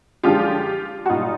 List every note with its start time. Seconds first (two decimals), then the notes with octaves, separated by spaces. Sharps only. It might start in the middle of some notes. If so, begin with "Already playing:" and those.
0.23 F#2 D3 F3 G#3 F4 G4
1.06 F#4
1.09 B1 A#2 G3 D#4 F4